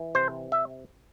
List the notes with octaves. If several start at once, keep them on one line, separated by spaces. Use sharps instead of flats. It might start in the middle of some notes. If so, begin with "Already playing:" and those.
Already playing: E3
C3 C5
E5